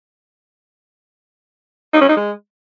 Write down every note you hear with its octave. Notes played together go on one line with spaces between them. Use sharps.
D#4
C#4
D#4
G#3